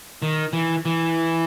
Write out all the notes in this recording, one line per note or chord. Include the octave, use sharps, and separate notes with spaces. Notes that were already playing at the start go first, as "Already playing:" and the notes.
D#3
E3
E3